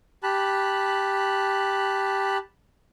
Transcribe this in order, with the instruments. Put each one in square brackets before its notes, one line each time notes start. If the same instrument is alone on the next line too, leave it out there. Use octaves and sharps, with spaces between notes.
[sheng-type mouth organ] G4 A5 B5 F#6